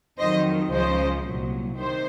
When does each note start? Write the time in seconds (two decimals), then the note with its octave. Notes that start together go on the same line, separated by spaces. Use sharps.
0.18 F2 D#3 F#3 C5 D#5
0.72 C#2 C#3 F3 C5 D#5
1.25 C2 A#2 F#3
1.78 C3 D#3 C5